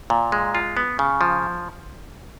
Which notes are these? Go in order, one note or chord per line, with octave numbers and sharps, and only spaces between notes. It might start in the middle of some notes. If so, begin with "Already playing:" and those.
A#2
G#3
F4
B3
C#3
F3